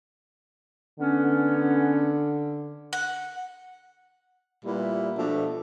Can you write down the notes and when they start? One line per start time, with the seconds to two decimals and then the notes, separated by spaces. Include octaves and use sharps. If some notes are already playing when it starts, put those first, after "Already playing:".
1.00 D3 B3 C#4
2.93 F#5
4.64 A#2 G3 B3 E4
5.17 B2 F3 A3 D4